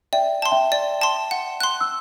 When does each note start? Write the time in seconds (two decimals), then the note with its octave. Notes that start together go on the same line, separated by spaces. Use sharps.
0.13 D5 E5 G5
0.42 A5 C6
0.52 E5 G5
0.72 D5
1.01 A5 C6
1.31 F#5
1.60 C6 F#6
1.81 E6